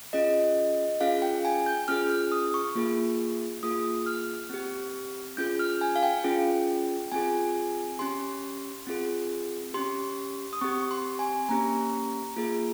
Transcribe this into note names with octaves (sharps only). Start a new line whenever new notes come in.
C#4 F4 G#4 D#5
C#4 F4 G#4 F5
G5
G#5
G6
C#4 F4 G#4 F6
F6
D#6
C#6
A#3 F4 G#4
A#3 F4 G#4 D#6
F6
C4 G4
C#4 F4 G#4 G6
F6
G#5
F5
G5
C#4 F4 G#4
C4 F4 G#4 G#5
C#4 G4 C6
C4 F4 G#4
C#4 G4 C6
D#6
C4 G4 C#6
C6
G#5
A#3 C#4 G4 A#5
A#3 F4 G#4